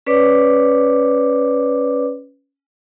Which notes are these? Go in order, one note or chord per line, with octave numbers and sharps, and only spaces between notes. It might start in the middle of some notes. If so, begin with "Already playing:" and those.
C#4 B4 C#5 D5 D6